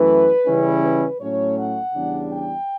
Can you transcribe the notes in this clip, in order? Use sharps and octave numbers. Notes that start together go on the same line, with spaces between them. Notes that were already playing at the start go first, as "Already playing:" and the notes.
Already playing: F#2 E3 A3 E4 B4
C#3 E3 G3 C#4 E4
B4
A2 F#3 A3 C#4 C#5
F#5
E2 C#3 G3 D4
G5